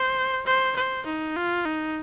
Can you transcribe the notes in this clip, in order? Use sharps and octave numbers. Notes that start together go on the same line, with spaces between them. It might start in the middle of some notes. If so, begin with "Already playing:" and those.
Already playing: C5
C5
C5
D#4
F4
D#4